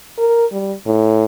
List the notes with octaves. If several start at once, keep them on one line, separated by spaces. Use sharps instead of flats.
A#4
G3
A2